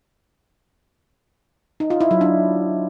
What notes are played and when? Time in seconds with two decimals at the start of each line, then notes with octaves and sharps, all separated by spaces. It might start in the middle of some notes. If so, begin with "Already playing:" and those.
1.80 D#4
1.90 F4
2.01 E4
2.11 F#3
2.21 D4